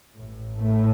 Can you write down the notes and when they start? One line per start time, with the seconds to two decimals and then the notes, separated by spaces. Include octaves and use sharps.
0.16 A1 A2
0.58 A2 A3